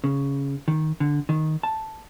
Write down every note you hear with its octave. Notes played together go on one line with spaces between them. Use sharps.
C#3
D#3
D3
D#3
A5